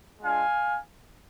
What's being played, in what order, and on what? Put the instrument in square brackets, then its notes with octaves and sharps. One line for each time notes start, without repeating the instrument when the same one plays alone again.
[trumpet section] G#3 D4 F4 F5 G#5